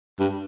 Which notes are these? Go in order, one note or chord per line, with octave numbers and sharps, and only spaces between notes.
G2